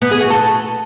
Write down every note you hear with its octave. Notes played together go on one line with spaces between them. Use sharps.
B3
G#4
F#4
A4